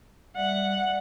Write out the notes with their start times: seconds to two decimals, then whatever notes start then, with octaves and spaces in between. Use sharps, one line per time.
0.36 G3 D5 E5 F#5